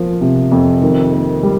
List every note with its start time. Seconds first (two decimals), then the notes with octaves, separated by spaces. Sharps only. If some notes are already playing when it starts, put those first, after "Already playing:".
Already playing: F3 A#3
0.21 C3
0.52 F2
0.82 D#3
1.13 A#3
1.43 G3